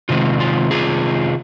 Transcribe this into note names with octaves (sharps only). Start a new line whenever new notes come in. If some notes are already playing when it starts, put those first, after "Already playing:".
C3 D#3 G#3 C4 F4
F4
F4 G#4